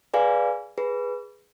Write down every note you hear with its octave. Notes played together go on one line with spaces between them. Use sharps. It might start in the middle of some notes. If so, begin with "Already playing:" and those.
G#4 B4 D5 F5 G#5
G#4 B4